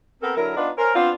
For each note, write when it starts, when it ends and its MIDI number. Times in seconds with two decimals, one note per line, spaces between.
0.22 0.33 59
0.22 0.33 60
0.22 0.33 69
0.22 0.33 70
0.36 0.55 50
0.36 0.55 54
0.36 0.55 64
0.36 0.55 70
0.56 0.69 59
0.56 0.69 62
0.56 0.69 63
0.56 0.69 65
0.56 0.69 71
0.56 0.69 74
0.77 0.91 61
0.77 0.91 70
0.77 0.91 72
0.95 1.10 59
0.95 1.10 60
0.95 1.10 62
0.95 1.10 65